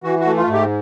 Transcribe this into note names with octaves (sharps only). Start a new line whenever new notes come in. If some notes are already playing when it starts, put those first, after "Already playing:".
E3 F#4
F#4
A3
F4
G#2
G4